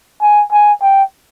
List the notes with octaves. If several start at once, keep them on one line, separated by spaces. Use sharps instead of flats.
G#5
G#5
G5